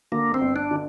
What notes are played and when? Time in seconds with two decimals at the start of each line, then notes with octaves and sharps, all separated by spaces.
0.12 D3 A#3
0.34 C4
0.41 G1
0.56 D4
0.71 D3